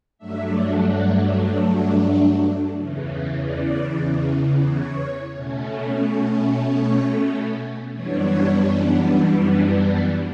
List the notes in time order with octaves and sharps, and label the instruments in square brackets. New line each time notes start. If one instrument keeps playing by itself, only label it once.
[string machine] G2 F#3 A3 D4 E5
F#5
E2 C#3 E3
D5
C#5
B2 A3 C#4
C#5
C#5
C#5
F#2 E3 G3 B3 D4 C#5
F#5